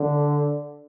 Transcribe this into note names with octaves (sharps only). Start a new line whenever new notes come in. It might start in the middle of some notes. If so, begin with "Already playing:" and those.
Already playing: D3